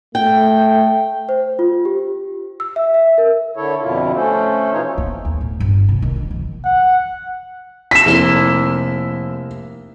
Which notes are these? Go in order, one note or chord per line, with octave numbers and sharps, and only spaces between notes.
A3 G5
C5
F4
G4
E6
E5
E5
A#4
D3 E4 A4 C#5
F2 B2 D3 E4 F4
A3 C#4 A4 C5
B2 E3 D#4 F4 C#5
B3
D#2
A2
G1
C3
D#3
D3
F3
F#5
B6 E7
F1 A#3 E4 C6